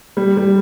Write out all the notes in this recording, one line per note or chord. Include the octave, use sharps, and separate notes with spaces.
G3
G3